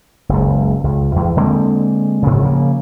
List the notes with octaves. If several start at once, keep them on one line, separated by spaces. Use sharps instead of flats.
F#1 C#2
C#2
E2
D3 G#3 A#3 C4
G#2 C#3
C#3 F3 A#3